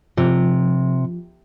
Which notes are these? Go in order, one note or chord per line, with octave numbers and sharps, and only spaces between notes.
C3 F3